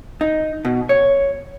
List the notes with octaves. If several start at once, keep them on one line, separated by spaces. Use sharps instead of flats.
D#4
B2
C#5